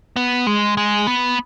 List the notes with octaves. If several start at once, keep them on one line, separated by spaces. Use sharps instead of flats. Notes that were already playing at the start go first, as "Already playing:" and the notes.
B3
G#3
G#3
B3